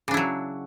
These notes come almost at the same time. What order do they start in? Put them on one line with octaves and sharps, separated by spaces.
C#3 D4 E4 F#3